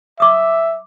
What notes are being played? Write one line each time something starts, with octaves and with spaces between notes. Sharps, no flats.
E5 D6 D#6